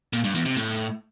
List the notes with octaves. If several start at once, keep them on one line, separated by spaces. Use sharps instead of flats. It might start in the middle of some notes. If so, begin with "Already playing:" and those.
A#2
G2
E2
C3
A2